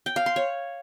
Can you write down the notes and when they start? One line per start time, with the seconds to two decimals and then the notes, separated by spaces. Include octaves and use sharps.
0.06 G5
0.16 F5
0.26 C6
0.36 C#5